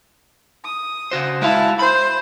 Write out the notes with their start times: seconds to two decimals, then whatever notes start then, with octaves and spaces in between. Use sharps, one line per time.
0.64 D#6
1.11 C#3 F#4 C5
1.42 G#3 E4 F#4 F5 A5
1.79 C5 B5